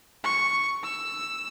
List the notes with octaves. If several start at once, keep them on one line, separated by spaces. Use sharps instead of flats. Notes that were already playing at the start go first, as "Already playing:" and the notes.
C#6
E6